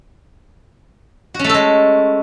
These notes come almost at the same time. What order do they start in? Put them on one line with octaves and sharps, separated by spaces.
F#4 C#4 A3 A4 G#3